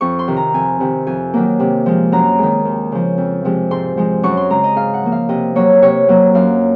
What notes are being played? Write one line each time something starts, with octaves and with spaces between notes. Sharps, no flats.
F2 C#6
C6
C3 D#3
A#5
F2 G#5
C3 D#3
F2 G#5
D#3 F#3 A#3
C3
F3 G#3
F#2 A#5
D#3 G#3
D#2
C#3 F3
F2
C3 F3 G#3
G#2 C6
F3 G#3
F#2 C#6
C6
C#3 G#3 A#5
D#5
G#2 F5
F#5
F3 A#3
F5
C3 D#5
F#3 A#3 C#5
C3 C#5
F#3 A#3
F#2 F5